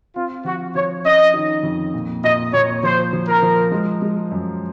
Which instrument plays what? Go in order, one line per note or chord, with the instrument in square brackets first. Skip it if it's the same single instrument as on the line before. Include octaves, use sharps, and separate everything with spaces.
[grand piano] C4 [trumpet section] F4
[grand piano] F3 [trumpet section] F#4
[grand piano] F3 [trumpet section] C#5
[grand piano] C#4 [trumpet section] D#5
[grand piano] D#3
F2
A#2
[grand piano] A#2 [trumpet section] D#5
[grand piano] A#2 [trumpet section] C#5
[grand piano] F3 [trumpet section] C5
[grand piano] F3
[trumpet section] A#4
[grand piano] F3
G#3
G#3
F#2